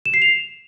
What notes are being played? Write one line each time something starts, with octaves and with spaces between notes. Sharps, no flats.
E7
C7
F7